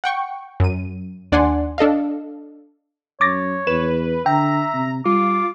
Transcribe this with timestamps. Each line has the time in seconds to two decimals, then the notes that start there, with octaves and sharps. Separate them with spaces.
0.04 F#5 G5 C#6
0.60 F#2 D#7
1.32 D#2 D4 D5 F#5 G#5 C6
1.78 D4 A4 D#5 F5
3.21 F#2 C#5 D6 A6 A#6
3.67 E2 B4 E7
4.26 D3 E5 G5 A#5
4.74 C3
5.05 G3 F4 D6